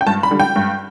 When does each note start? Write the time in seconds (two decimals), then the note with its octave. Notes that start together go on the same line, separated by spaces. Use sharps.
0.01 G5
0.07 G2 A5
0.23 B5
0.31 D3 G3
0.40 G5
0.56 G2